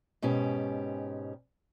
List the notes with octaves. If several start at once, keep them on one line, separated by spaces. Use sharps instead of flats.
G#2 B2 C#4 G4